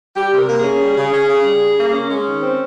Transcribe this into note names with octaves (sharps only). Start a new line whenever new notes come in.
G3 G4
C3
A#4
A#3
G#4
C#4
G3
C#3
C#4
C#3
G3
C#3
A#3
C#4
G#3 C#4
D#3
C4